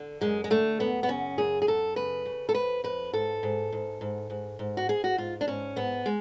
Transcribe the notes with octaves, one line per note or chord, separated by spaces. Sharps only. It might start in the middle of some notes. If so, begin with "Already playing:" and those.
Already playing: D3
F#2 G#3
G#3
D3 A3
F#2 B3
B3
C#3 C#4
F#2 G#4
G#4
F#2 A4
C#3 B4
C#3
A4
F2 B4
F2 B4
G#2 A4
G#2
G#2
G#2
G#2
G#2
F#4
G#2 G#4
F#4
G#2 F4
D4
G#2 C#4
G#2 B3
G#3